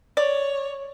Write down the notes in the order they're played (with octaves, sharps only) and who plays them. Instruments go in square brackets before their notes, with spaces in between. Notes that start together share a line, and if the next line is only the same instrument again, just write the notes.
[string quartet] C#5 [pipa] D5